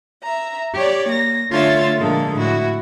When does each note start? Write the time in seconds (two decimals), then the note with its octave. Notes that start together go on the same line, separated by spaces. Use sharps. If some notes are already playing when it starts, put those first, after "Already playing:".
0.22 E5 A#5
0.74 G4 C#5 D5
1.10 A#3 A#6
1.51 D3 A3 F4 C#5 E5 A6
1.99 A#2 D3 F3 G#3 A#3 A4
2.36 A2 E4 F#4